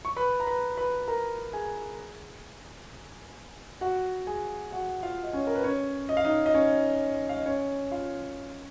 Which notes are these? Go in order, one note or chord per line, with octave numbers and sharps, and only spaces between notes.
C#6
B4 B5
A#5
B4 B5
B4 B5
A#4 A#5
G#4 G#5
F#4 F#5
G#4 G#5
F#4 F#5
F4 F5
D#5
C#4 C#5
A#4
B4
C#4 C#5
D#5
F5
D#4 D#5
D#5
C#4 C#5
F5
D#5
C#4 C#5
F4 F5